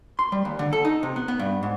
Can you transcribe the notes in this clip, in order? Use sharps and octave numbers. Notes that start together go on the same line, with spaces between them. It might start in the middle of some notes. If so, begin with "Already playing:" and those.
C6
G3
D#2
D3
A4
D#4
C3
B3
B3
G2
G#2